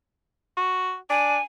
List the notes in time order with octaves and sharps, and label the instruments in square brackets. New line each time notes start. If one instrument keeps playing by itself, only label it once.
[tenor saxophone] F#4
[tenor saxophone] D4 [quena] G#5